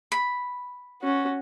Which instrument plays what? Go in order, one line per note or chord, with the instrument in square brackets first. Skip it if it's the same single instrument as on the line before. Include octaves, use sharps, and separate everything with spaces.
[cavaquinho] B5
[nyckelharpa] C#4 F#4